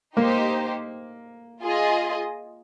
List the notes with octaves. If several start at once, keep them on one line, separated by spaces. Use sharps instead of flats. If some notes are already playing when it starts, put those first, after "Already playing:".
A#3 D#4 G4 C5
F4 G#4 D#5